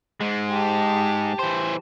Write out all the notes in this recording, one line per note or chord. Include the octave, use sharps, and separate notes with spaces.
G#2 G#3
G4 A5
E3 C5